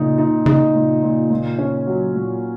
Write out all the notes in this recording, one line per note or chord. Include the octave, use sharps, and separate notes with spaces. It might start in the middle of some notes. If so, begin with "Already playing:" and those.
Already playing: A#2 C#3 D#4
D#4
C#3 D#4
A#2
A#2
A#2
C#4
F#3
A#2